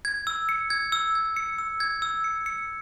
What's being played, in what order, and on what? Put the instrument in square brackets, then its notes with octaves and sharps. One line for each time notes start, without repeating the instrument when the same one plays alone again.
[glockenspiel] G#6
E6
C#7
G#6
E6
G#6
C#7
E6
G#6
E6
C#7
C#7